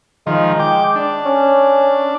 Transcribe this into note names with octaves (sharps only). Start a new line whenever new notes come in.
D#3 F3 G#3
G5 D6
D4
C#4